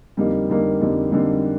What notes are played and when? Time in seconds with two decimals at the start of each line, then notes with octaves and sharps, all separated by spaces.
0.17 F2 D3 G3 A#3 D#4
0.48 F2 D3 G3 A#3 D#4
0.80 F2 D3 G3 A#3 D#4
1.12 F2 D3 G3 A#3 D#4